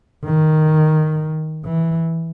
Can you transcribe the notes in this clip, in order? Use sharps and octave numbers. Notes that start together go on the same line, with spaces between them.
D#3
E3